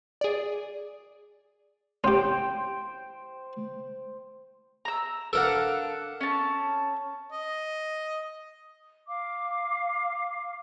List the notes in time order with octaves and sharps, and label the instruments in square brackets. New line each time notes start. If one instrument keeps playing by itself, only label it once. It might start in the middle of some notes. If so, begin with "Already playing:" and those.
[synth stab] G#4 D5
[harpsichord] C#4 G4 [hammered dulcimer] C5 G5
[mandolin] A#5 E6
[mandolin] D4 F5 F#5 [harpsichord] A4 A#4
[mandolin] C#4 A5
[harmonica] D#5
[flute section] F5 D6